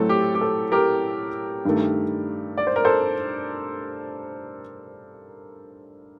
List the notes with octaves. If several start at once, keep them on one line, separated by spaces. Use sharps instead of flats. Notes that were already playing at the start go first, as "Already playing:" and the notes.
Already playing: A2 F#3 A3 C4 A4
G4
G4
A4
G4 A#4
G2 D#3 A3
D5
C5
A#4
A4 C5